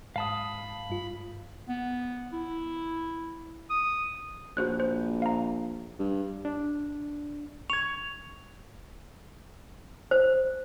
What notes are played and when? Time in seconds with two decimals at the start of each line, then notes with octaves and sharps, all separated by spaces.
0.16 G#2 F5 A5 B5 D#6
0.90 G2 F4
1.69 B3
2.33 E4
3.70 D#6
4.57 A#1 F#4 C5 F#6
4.80 C5
5.22 F5 A#5
5.99 G2
6.45 D4
7.70 C#6 G#6 F7
10.11 C5